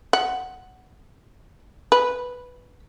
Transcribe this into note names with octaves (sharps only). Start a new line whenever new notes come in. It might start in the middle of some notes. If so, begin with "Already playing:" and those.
F#5
B4